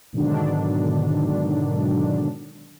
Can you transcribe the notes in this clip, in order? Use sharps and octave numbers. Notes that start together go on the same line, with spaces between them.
G#2 B2 D3 D#3 F#3 D4